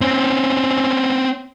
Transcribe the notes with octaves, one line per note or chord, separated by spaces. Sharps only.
C4 C#4